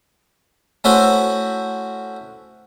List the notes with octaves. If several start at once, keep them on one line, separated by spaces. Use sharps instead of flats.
A3 C#4 E4 F#4 C5 E5